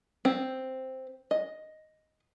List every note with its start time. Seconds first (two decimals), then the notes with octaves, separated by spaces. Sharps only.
0.25 C4
1.31 D#5